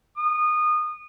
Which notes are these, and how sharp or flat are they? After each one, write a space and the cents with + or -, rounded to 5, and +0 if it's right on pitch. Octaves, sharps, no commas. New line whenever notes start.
D#6 -25